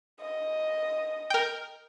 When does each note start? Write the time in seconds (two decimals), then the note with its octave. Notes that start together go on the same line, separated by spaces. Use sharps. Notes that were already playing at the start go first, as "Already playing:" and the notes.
0.20 D#5
1.30 A#4 G5